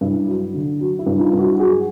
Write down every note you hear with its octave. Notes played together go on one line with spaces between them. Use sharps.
G2 E4
F#3
D3
F#3
E4
G2
D#4 F4
G2
E4 F#4
F#3 F#4 G#4